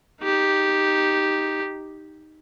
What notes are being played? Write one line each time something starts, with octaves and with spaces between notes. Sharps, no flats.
D#4 G4